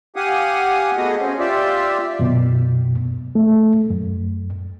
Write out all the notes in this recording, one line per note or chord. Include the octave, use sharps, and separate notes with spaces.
G4 F5 F#5 G#5 D#6
A3 B3 F#4 G#4 D#5
C4 C#4
F4 G4 D5 E5
F#2 B2
A3
F#2